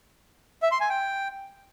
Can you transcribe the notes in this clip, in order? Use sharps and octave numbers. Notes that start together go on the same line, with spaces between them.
E5
C6
G#5
G5